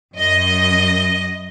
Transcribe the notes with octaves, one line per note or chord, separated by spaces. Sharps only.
F#2 D#5